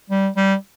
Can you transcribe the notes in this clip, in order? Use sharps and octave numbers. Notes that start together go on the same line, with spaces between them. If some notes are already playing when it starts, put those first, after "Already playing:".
G3
G3